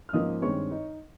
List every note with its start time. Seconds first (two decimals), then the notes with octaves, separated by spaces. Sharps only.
0.09 F6
0.13 G#2 F3 A#3 C#4 D#5 D#6
0.42 G2 D#3 G#3 C4 C#5 C#6
0.71 D#4